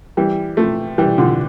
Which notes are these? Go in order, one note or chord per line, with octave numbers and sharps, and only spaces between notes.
E3 G3
F3 A3
E3 G3
D3 F3